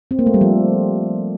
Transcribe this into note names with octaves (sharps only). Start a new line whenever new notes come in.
C4
A#3
A3
G3
F3